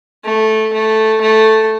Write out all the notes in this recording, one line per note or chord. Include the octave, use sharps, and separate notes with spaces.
A3
A3
A3